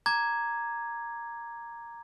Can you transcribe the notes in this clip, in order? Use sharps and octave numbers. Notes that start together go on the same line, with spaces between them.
A#5 D6 G#6